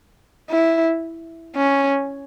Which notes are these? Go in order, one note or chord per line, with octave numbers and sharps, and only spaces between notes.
E4
C#4